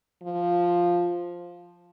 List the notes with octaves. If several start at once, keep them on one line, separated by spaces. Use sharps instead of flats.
F3